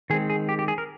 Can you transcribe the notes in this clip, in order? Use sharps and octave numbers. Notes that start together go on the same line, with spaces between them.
D#3 G#3 C4 G#4
G#4
G4
G4
G#4
A#4